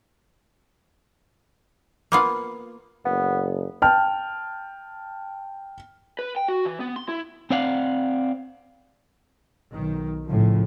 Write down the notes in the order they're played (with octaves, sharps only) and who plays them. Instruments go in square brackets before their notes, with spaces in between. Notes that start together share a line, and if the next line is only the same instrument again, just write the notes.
[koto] A#3 B3 F4
[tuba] F#1 [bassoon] B3
[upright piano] G5 A5 F6
[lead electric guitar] B4
G5
F#4
E3
B3
C6
E4
[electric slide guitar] C4 C5 D5 F5 F#5
[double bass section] B1 D#3
A2 C#3 F3